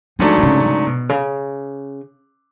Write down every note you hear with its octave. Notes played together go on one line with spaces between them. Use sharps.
G#2 F3 F#3 A3 D4
D3
C#3
C#3
B2
C#3